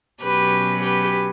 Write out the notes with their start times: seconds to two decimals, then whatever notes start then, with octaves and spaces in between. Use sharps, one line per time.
0.21 B2 F#3 C#4 G4 B4
0.82 G4 B4